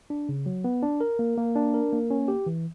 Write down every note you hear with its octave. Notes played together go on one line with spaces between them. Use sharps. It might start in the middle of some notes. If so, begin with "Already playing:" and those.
D4
C#3
F#3
B3
D4
A#4
A#3
A#3
D4
A#4
A#3
C#4
G4
E3